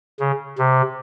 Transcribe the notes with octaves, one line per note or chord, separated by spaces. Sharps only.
C#3
C3